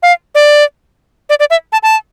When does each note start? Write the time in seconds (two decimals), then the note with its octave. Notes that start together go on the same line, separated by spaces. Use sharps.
0.03 F5
0.35 D5
1.30 D5
1.40 D5
1.50 E5
1.73 A5
1.83 A5